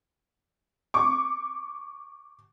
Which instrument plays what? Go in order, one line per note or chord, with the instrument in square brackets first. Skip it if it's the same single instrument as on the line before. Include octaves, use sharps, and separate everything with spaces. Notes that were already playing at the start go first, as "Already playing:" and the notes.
[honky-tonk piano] C#6 D6